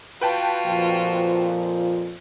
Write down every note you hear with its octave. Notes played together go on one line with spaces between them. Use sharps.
F4 F#4 B4 G5 A5
F2 A#2 F3